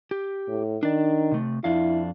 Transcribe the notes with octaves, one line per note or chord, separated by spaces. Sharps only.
G4
A2
D#3 D4 D5
C3 A3
F2 D4 E4 F5